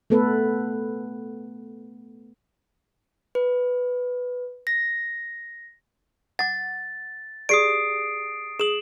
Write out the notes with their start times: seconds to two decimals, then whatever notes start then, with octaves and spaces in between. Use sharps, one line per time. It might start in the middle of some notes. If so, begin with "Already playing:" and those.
0.10 A3 B3 A4 B4
3.35 B4
4.67 A#6
6.39 F#5 D6 A6
7.49 G4 G#4 D5 D#6 C7 D7
8.60 G#4 D#6 E7 F#7